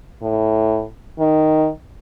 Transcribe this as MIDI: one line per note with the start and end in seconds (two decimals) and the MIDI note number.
0.22 0.84 45
1.19 1.68 51